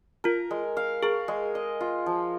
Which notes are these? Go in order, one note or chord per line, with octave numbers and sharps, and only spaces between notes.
F4 A#4
G#3
F5
G#4 A#4
G#3
D#5
F4
F3